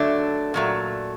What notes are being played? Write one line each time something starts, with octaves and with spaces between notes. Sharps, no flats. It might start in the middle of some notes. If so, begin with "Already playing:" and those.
Already playing: D3 F#3 A3 D4
A#2 F#3 A3